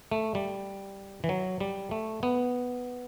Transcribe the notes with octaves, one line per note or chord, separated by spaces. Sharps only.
A3
G3
E3
F#3
G3
A3
B3